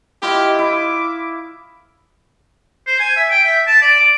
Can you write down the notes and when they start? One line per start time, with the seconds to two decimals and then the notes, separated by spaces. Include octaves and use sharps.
0.22 E4 F4 G4 D#5
0.59 E4 D6
2.87 C5
3.00 G#5
3.16 E5
3.30 G5
3.44 E5
3.67 A5
3.82 D5
4.00 D6